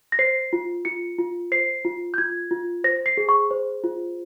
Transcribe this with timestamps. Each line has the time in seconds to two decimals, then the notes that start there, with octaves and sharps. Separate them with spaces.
0.12 A#6
0.19 C5 C7
0.53 F4
0.85 F4 C#7
1.19 F4
1.52 C5 C7
1.85 F4
2.14 G6
2.18 F4 G#6
2.51 F4
2.84 C5 A#6
3.06 C7
3.17 G#4
3.29 C#6
3.51 C5
3.84 F4